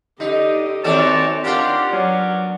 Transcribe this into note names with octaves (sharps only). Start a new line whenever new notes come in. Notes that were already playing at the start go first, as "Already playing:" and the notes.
D3 D#4 G4 D#5
D#3 C4 F#4 A4 C#5 D5 A5
D4 F4 G4 A#4 F#5
F#3 B3 C#4 D5